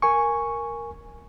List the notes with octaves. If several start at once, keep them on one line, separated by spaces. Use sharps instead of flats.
A#4 G#5 C#6